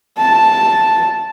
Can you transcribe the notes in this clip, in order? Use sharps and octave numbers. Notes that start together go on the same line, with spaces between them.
A5